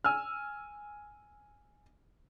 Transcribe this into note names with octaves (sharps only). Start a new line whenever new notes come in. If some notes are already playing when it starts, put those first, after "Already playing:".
G#5 E6 F6